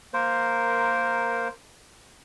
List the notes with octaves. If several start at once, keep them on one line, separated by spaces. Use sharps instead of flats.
A#3 A#4 C5